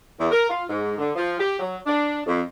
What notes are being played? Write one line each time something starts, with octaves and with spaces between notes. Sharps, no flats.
E2
A#4
F4
G#2
D3
F3
G4
F#3
D4
F2